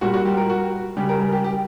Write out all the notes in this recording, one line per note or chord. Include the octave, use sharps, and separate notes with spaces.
A#2 G3 F#4
F#4
G4
A#4
F#4
C#3 G3 G4
A#4
A#4
G4
G4